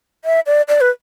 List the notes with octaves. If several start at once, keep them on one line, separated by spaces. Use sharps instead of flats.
E5
D5
D5
B4